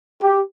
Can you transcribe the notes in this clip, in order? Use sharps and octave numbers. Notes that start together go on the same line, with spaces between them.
G4